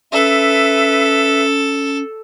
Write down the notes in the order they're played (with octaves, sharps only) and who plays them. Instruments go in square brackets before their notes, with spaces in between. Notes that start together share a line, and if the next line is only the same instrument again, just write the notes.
[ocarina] C#4 [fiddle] A4 [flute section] B4 E5